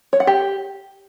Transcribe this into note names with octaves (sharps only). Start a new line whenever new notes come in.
C#5
F#5
G4